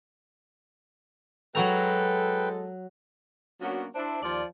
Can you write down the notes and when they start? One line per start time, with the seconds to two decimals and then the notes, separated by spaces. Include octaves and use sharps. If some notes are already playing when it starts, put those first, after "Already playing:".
1.55 F#3 G#3 F#4 A4 B4 G5 A#5
3.61 F#3 A#3 B3 C#4 D4 F#4
3.95 D4 E4 C5
4.23 D#2 F3 F4 D5